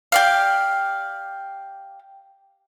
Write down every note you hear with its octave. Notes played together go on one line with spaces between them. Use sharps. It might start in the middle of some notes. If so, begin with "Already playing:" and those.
G4 D5 F5